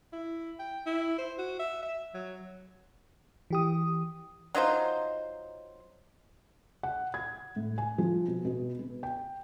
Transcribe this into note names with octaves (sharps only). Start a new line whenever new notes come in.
E4
G5
E4
C5
F#4
E5
E5
F#3
E3 G4 D#6
F#3 D#4 F4 C5
F#5
G#6
A2
G#5
F3
B2
B2
B3
G5